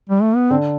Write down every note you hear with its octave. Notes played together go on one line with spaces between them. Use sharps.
G3
A3
B3
D3 C4